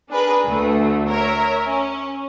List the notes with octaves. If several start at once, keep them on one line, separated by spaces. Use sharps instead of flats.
D4 G#4 A#4 B4
D2 A3
A#4 C#5 E5
C#4